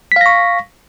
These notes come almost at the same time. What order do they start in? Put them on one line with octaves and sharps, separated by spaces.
B6 F5 A#6 C#6